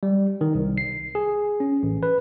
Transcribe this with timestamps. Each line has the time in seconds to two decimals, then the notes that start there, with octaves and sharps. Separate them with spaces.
0.03 G3
0.41 D#3
0.55 C2
0.78 C7
1.15 G#4
1.60 C#4
1.83 A1
2.03 B4